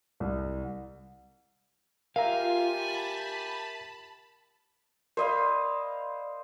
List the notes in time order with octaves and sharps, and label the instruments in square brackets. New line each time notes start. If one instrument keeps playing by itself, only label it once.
[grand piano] C2
[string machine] F4 [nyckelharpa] G4 G#5 [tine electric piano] A#4 E5 A#5 [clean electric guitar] F5
[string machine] A5 B5
[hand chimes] A#4 D5 B5 [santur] C5 D#5 F5